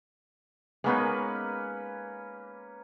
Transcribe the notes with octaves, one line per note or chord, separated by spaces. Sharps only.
G#3 A#3 B3 C#4 D#4 B4